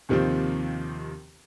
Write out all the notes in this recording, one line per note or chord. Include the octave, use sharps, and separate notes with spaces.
D#2 C3 D#3 F3 C4